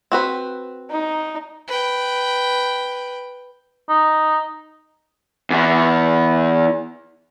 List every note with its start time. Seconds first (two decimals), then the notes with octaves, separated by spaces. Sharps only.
0.12 C4 F#4 B4
0.91 D#4
1.68 B4 G5
3.90 D#4
5.50 E2 E3